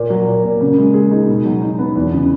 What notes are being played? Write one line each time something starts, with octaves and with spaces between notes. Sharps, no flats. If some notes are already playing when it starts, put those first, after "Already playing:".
Already playing: A#2 A#3
F#3
A#2
A#3
C#3
G#3
G#4
D#4
B2
F#3
D#4
B3
E2
C#3